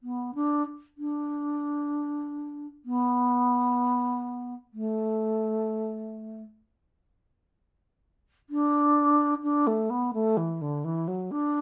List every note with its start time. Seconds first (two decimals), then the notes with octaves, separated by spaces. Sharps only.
0.03 B3
0.35 D4
0.98 D4
2.85 B3
4.73 A3
8.50 D4
9.43 D4
9.67 A3
9.90 B3
10.14 A3
10.37 E3
10.61 D3
10.84 E3
11.08 F#3
11.31 D4